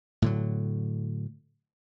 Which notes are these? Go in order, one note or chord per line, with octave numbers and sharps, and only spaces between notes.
A2 D3 F#3